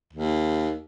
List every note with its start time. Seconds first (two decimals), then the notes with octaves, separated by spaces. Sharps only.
0.13 D#2